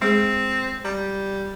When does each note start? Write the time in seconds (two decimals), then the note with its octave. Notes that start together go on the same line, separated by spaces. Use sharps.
0.02 G#3 C4 G#4
0.85 G3 A#5